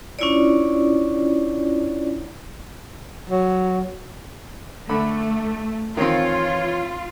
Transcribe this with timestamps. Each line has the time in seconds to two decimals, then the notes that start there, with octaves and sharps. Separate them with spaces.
0.19 C#4 D4 E4 F4 C#5 D5
3.29 F#3
4.89 D3 A3 B5
5.97 D#3 E3 C4 F4 C#5